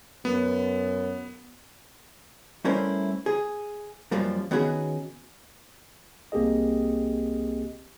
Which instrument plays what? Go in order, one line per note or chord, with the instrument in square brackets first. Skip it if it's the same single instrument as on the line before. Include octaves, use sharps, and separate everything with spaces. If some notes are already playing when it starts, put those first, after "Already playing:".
[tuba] F#2 [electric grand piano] B3
[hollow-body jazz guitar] G3 A3 C#4 E4 A#4 C5
G#4
F#2 F3 G3 A#3
D#3 B3 C#4 F#4 G#4
[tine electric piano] C2 A#3 C4 G4 G#4 D#5